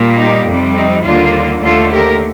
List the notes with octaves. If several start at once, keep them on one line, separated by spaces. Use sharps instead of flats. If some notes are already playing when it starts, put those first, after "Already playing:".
Already playing: A#2 G3 A#3
D#4 G4
F2 C3 G3
C4 D#4
D#2 D3 G3 A#3 D4 F4
D#2 D3 A3 F4 A4
G4 A#4